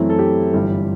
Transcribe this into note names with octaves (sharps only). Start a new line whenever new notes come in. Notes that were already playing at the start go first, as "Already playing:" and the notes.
Already playing: F#2 E3 A3 C4 E4
A4
G4
G1 G2 E3